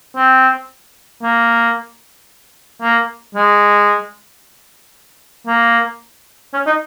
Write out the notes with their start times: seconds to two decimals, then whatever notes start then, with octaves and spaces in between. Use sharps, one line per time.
0.16 C4
1.23 A#3
2.82 A#3
3.35 G#3
5.47 A#3
6.54 C#4
6.67 D#4